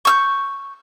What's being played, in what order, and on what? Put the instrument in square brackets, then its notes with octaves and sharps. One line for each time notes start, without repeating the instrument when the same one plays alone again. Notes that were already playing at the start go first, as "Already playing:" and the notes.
[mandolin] C#6 E6 G6